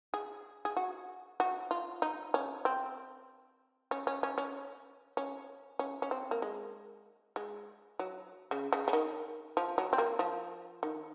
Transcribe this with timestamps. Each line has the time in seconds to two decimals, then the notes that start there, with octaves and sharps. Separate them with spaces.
0.14 G#4
0.65 G#4
0.77 F#4
1.40 F#4
1.71 F4
2.02 D#4
2.34 C#4
2.65 C4
3.91 C#4
4.07 C#4
4.23 C#4
4.38 C#4
5.17 C#4
5.79 C#4
6.02 C#4
6.11 C4
6.31 A#3
6.42 G#3
7.36 G#3
7.99 F#3
8.51 C#3
8.73 C#3
8.88 C#3
8.93 D#3
9.57 F3
9.78 F#3
9.93 C4
9.98 A#3
10.19 F3
10.83 D#3